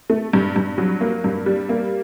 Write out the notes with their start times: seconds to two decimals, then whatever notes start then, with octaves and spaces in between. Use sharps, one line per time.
0.10 A3
0.33 G2
0.56 G2
0.78 F#3
1.01 A#3
1.24 G2
1.46 G3
1.69 A#3